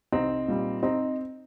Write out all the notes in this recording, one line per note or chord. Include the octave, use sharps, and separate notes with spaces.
C2 C4 D#4
A#2 G3
C4 D#4